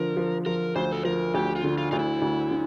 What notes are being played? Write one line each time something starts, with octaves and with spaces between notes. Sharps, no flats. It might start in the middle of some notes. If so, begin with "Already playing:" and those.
Already playing: D3 F3 A#4
F3
F3 A#4
D2 C5
A4
F3 A#4
D2 G4
F4
D3
F4
D2 F4
E4
D2
D3